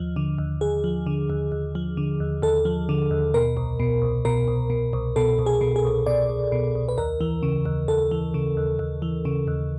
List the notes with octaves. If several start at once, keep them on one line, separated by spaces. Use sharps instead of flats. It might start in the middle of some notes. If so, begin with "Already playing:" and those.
Already playing: D#2 F3
D3
D#2
D#2 G#4
F3
D3
D#2
D#2
F3
D3
D#2
D#2 A4
F3
D3
D#2
B2 A#4
C2
B2
C2
B2 A#4
C2
B2
C2
B2 A4
C2
G#4
B2
G#4
C2
B2 D5
C2
B2
C2
B4
D#2 A#4
E3
C#3
D#2
D#2 A4
E3
C#3
D#2
D#2
E3
C#3
D#2